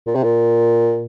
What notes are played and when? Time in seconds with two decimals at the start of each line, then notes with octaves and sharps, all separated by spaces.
0.07 A#2
0.15 C3
0.23 A#2